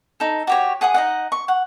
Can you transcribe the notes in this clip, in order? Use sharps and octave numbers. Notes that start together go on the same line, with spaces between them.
D#4 A4
F#4 G4 C#5
G#4 F#5 G#5 D#6
D#4 D#5 F#5
C#6
F#5